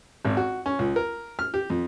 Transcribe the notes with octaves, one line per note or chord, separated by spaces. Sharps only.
G#1
F#4
C#4
C#2
A#4
F6
G4
F2